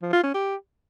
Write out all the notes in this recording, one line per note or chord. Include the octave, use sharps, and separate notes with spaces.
F3
F4
C#4
G4